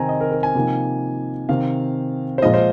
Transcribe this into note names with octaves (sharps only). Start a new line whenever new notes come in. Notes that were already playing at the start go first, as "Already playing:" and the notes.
Already playing: C3 D#3 C4 D#4 G#5 A#5
D#5
A#4
A#4
G#5
C3 F3 A#3 D#4
C3 D#3 C4 F5
C5
A#2 F3 G#3 F4 D#5
C5